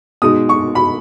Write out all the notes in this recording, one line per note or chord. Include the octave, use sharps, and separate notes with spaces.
B2 G#3 D#4 D#6
C#6
B5